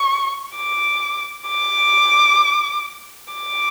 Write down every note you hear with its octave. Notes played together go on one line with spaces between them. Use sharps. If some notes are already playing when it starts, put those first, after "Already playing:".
Already playing: C#6
D6
D6
D6